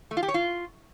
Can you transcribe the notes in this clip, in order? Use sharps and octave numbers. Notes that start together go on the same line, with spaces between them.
A3
F4
G4
C#5
F4